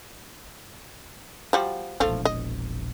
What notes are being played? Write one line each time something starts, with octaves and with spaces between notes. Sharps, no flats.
F3 G3 F#4
E1 A#1 F3 A3 F4
D#5